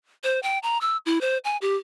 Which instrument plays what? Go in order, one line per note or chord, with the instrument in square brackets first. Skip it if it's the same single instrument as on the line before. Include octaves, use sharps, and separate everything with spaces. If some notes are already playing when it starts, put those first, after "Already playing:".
[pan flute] C5
G5
A#5
E6
E4
C5
G#5
G4